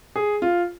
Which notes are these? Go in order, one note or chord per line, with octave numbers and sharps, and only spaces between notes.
G#4
F4